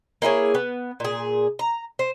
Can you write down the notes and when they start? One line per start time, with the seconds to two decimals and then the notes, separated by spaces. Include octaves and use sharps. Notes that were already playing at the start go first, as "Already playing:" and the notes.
0.22 A#3 E4 G#4 C#5
0.55 B3
1.00 A#2 G#4
1.59 A#5
1.99 C5